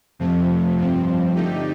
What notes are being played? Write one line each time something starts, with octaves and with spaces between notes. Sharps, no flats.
F2 C3 F3 A3
G2 F3 C4
D3 A3 D#4 G4